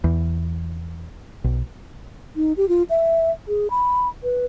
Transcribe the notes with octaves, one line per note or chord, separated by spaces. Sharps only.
E2
B1
D#4
G4
F4
E5
G#4
B5
B4